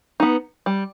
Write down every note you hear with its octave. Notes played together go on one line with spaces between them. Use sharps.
B3 D#4
G3